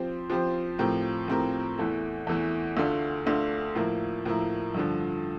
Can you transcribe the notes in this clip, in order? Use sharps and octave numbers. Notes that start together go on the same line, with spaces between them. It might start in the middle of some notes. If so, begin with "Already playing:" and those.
Already playing: F3 C4 G4 C5
F3 C4 G4 C5
A2 F3 C4 G4 A#4
A2 F3 C4 G4 A#4
E2 E3 A3 E4
E2 E3 A3 E4
D2 D3 A3 D4 F4
D2 D3 A3 D4 F4
A2 F3 A#3 E4 A#4
A2 F3 A#3 E4 A#4
G2 D3 F3